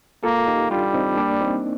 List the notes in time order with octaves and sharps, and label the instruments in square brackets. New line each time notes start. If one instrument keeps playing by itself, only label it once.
[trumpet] A#3 [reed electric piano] F4 A4
[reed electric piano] D#4 G4
[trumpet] G3 [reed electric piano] D4 F4
[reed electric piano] C4 D#4
A#3 D4
C4 D#4